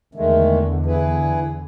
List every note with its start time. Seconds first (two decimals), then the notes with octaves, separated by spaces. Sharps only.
0.15 E2 D3 D#3 G#3 A3
0.86 E4 G#4 B4